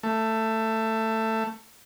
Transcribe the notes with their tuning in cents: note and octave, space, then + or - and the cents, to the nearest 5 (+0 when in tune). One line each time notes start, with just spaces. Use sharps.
A3 +15